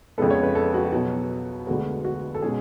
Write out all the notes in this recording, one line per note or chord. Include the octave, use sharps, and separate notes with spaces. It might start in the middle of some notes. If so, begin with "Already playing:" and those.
F2 C#3 G#3 B3 A4
C#5
B4
A4
F#4
B2 F#3 B3 F#4
D2 D3 G#3 B3 F#4
F#4
A4
B2 G#3 C#4 G#4